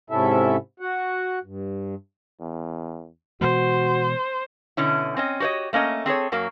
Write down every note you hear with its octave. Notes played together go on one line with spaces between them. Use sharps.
G#2 C3 C#4 E4 A4 E5
F#4 F#5
G2
E2
B2 E3 G#3 F#4 C5
B2 D3 C#4 E4
C4 C#4 D#5
F#4 G4 C5 C#5 D#5
A3 A#3 C#4 D#5
C4 G#4 A4 C#5
F#2 F#3 A#3